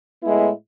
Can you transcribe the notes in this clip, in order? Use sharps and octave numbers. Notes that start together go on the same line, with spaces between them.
A2 G#3 B3 E4